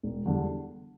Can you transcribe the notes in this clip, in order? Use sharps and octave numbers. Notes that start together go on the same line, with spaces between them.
E1
E2 D3 G3